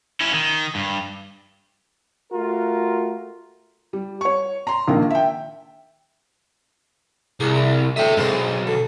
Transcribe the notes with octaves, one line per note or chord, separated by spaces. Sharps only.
C#4 E4
D#3
G2
A3 F4 F#4 A#4
G3
C#5 C#6
A#5 C6
A#1 D#3 A#3
E5 G5
C2 G#4
D2 A2 E5 G5 D#6
B1 G2 G#3 C4 C5
D3